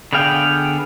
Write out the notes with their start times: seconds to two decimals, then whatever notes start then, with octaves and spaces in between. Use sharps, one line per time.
0.13 D3 B3 G#4 F5 G5